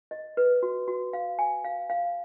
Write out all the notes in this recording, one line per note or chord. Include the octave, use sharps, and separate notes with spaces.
D#5
B4
F#4
F#4
F5
G#5
F5
F5